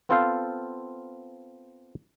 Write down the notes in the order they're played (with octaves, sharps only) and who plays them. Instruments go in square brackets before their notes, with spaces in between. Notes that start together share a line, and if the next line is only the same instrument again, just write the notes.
[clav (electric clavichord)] B3 C4 F4 A4 C5 F5